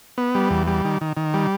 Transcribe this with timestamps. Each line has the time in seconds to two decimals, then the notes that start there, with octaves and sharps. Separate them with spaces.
0.18 B3
0.35 G3
0.51 E2
0.67 G3
0.85 D#3
1.01 D#3
1.17 D#3
1.34 G3